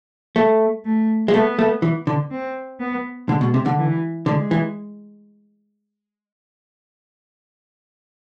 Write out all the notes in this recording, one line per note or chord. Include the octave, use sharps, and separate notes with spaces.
A3
A3
G#3
A3 B3
A3
E3
D3
C4
B3
D3 G#3
B2
C3
D3
E3
D3 G#3
E3